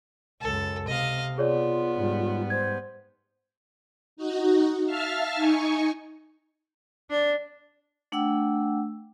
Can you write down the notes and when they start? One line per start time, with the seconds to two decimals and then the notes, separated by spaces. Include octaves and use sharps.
0.41 C#2 F#2 A4
0.88 C3 D#5 F5
1.38 B3 F4 G#4 C#5 D5
1.96 G#2 G3
2.50 C5 G#6
4.17 D#4 F#4
4.85 E5 F5 A5 F6
5.35 D#4 G#5 C#6
7.10 D4
8.12 A3 D4 F#5 G5 E6